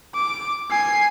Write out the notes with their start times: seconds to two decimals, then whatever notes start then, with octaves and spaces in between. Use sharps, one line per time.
0.14 D6
0.70 G#5 C7